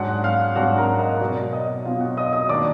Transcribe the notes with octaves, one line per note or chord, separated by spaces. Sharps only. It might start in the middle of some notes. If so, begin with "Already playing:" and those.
Already playing: G#2 F#3 D4 F#5 F#6
F5 F6
G#2 F#3 D4 F#4 F#5
A#4 A#5
D#5
B2 F#3 B3 D5
D#5
B2 F#3 B3 F4 F5
F#4 F#5
D#5 D#6
D#5 D#6
D#3 A#3 D4 D5 D6